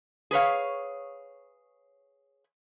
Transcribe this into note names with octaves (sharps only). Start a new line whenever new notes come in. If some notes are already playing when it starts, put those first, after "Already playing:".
G#4 B4 C#5 F5